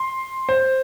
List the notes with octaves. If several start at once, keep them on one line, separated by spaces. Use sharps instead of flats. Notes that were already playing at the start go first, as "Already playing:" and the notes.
Already playing: C6
C5